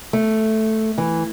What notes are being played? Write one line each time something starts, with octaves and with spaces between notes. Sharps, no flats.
A3
E3